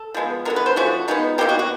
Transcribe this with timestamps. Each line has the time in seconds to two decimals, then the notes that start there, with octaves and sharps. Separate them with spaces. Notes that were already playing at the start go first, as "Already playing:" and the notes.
Already playing: A4
0.14 F3 G#3 B3
0.45 D3 F#3 B3 A#4
0.56 B4
0.66 C5
0.76 F3 A3 C#4 F#4
1.08 F3 G#3 B3 D#4
1.38 B2 F#3 A#3 G4
1.49 F#4
1.59 F#4